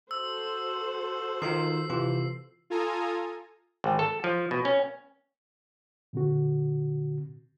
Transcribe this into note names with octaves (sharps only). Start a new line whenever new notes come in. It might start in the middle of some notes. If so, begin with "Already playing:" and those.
F#4 A4 C5 E6
D#3 D#4 F4 C7
C3 E3 F4
F4 A4 G#5 A#5 D#6
G#1
A4
F3
B2
C#4
A#2 D3 C4 F#4